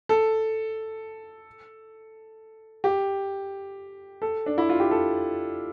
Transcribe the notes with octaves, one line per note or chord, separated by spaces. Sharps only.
A4
G4
A4
D4
E4
F4
G4
A4